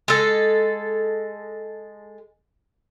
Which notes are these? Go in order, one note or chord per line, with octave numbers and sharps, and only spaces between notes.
G#3 A4